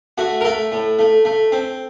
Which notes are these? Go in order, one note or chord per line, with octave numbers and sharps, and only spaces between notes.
A3 F#4
A#4
A3 A4
A2
A3
A3
C4